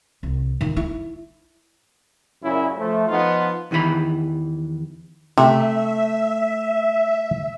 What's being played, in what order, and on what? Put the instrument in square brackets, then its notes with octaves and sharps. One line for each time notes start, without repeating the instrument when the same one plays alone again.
[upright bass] C2
D#3
E4
[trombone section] F#2 A#2 C#3 C#4 E4
F3 A3
F3 B3 D#4 F4
[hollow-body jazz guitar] E2 D#3 E3 B4 B5
[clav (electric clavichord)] C3 [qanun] A3 [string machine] E5